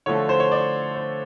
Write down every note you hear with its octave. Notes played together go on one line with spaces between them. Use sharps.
D3 F3 A3 C#5
C5
C#5
D5
C5